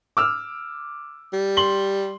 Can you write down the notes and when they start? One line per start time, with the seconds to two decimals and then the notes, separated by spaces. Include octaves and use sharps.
0.17 D6 E6 F6
1.33 G3
1.57 C6 F#7 G7